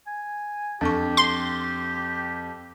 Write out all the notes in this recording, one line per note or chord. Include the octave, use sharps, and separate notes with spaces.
G#5
F2 D4 G4 A4 C#6
C6